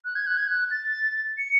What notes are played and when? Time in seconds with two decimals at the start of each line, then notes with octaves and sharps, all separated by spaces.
0.05 F#6
0.15 G#6
0.27 F#6
0.37 G#6
0.48 F#6
0.71 A6
1.38 C#7